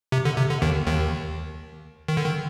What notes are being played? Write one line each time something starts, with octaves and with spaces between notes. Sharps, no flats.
C3
D3
C3
D3
D#2 D#3
D#2 D#3
D#3
D3
D#3